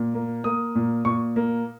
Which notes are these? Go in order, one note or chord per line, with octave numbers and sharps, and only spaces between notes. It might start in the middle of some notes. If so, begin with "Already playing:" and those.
Already playing: A#2
A#3
A#3 D#6
A#2
A#2 C#6
A#3